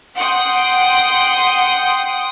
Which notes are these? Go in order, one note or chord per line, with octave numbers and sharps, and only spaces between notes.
F#5 G5 C6 D#6